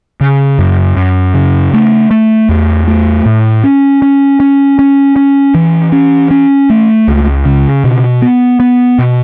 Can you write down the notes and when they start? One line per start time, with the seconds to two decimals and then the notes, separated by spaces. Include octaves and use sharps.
0.21 C#3
0.59 F#2
0.96 F#2
1.34 C#3
1.73 A3
2.11 A3
2.49 E2
2.88 A3
3.26 A2
3.64 C#4
4.02 C#4
4.40 C#4
4.79 C#4
5.16 C#4
5.55 E3
5.92 C#4
6.31 C#4
6.70 A3
7.08 C#2
7.45 C#3
7.84 B2
8.22 B3
8.60 B3
8.99 B2